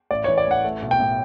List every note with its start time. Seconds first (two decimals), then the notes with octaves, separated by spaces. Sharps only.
0.11 A1 D5
0.24 E3 C#5
0.38 D5
0.47 A1 F#5
0.64 A3
0.82 B1
0.91 G5
1.00 A2